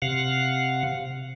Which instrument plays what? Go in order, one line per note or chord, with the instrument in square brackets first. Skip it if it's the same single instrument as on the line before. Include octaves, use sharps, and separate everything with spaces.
[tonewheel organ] C3 F5 F#5